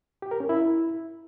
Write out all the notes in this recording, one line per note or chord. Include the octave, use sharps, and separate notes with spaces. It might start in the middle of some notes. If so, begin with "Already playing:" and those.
G4
A#4
C#4
E4